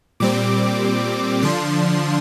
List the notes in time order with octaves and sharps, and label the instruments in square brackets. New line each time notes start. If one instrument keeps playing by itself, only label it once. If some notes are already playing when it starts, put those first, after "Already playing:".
[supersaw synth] A#2 G3 C4 D6
D3 F3 D4 C6